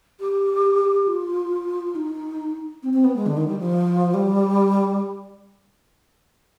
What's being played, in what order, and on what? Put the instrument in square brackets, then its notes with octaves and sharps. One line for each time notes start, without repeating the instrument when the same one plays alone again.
[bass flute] G4
F4
D#4
C4
C4
B3
G#3
D3
D#3
G3
F3
G3